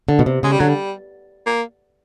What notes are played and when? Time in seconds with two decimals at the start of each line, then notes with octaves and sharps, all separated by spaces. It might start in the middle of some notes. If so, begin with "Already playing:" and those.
0.09 D3
0.19 B2
0.26 C3
0.43 C#3 G#3
0.52 G3
0.59 D3 F#3
0.69 G3
1.46 A#3